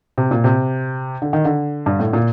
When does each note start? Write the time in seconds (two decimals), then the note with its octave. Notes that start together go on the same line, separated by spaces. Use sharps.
0.18 C3
0.31 A#2
0.44 C3
1.22 D3
1.33 D#3
1.45 D3
1.86 G2
1.99 A2
2.13 A#2